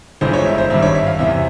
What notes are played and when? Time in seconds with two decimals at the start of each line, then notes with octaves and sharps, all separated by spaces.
0.21 G1 G2 E3 G#3 C5
0.33 C#5
0.46 E5
0.58 C5
0.70 G#1 G2 G3 E5
0.82 C#5
0.95 E5
1.07 F5
1.19 E2 C3 E3 E5